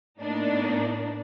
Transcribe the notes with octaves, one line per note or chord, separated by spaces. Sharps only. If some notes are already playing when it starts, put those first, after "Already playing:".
A2 A#3 B3 D4 D#4